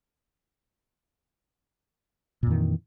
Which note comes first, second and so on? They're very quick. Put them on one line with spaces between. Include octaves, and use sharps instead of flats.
A#2 F2 D#3 E3